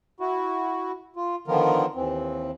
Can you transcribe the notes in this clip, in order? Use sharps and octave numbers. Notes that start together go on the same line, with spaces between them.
E4 F#4
F4
D3 D#3 F3 B3 F4 A#4
D#2 E3 C4